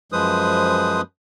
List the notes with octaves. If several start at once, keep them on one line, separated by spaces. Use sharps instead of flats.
F#2 F3 G#3 B4 C5 D#6